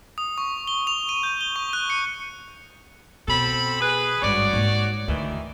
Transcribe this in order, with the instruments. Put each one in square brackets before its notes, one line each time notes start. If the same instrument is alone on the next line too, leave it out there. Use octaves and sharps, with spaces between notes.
[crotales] D#6
C#6
G7
F7
D#7
G6
G7
C#6
F#6
C#7
[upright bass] B2 [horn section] C4 A4 B5
[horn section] G#4 B4
[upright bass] G#1 G2 [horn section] F#4 C#5 D5
[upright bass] G#2 A#3
[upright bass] D2 [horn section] D#3 E3